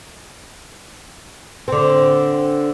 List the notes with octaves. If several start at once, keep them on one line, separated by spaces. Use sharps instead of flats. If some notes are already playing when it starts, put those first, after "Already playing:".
D3 C4